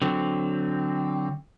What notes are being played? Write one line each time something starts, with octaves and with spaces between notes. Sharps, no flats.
D3 F#3 C4